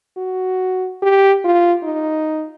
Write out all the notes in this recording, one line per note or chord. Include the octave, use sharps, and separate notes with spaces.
F#4
G4
F4
D#4